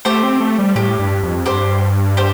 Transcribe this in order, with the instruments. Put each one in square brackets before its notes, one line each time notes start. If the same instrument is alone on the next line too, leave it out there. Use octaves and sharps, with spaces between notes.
[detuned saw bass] A3 [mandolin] G4 C5
[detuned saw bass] C4
A3
G3
[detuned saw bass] A2 [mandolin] G4
[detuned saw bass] G2
F2
[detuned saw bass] G2 [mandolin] G4 C5
[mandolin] G4 C5